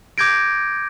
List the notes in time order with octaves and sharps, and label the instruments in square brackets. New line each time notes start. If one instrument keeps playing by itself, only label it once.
[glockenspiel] D6 G6 G#6 A#6 D7